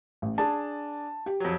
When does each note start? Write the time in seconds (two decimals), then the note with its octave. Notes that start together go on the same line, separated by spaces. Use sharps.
0.22 A1
0.38 D4 G#4 A5
1.26 G4
1.40 F2 F#3